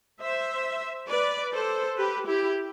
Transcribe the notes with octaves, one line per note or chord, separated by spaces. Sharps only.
C5 E5
B4 D5
A4 C5
G4 B4
E4 G4